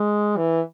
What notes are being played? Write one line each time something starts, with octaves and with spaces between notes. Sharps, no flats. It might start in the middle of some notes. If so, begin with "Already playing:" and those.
Already playing: G#3
E3